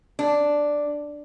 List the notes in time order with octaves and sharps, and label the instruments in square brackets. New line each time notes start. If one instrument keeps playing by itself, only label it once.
[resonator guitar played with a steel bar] D4